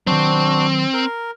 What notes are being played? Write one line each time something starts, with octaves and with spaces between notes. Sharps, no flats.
D#3 F#3 C4 D4 F#4
A#4